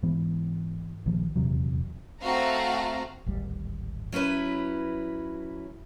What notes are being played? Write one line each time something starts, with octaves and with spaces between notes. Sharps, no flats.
G#2 E3 B3
A#1 D#3 F3 A#3
D#1 E2 C3 F#3
A3 C4 F#4 F5 A#5
D1 G#1 G3
F#3 C#4 E4 B4